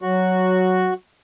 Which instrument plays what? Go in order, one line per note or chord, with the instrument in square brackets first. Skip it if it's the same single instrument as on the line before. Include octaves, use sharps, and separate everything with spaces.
[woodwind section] F#3 [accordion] F#4